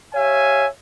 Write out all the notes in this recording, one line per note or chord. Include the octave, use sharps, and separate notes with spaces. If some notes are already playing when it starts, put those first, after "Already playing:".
G4 C#5 E5 F5 G#5